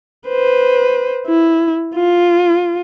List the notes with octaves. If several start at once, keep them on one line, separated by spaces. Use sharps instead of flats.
B4 C5
E4
F4